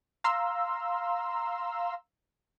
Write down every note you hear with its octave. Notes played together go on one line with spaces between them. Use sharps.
F5 A#5 C6 E6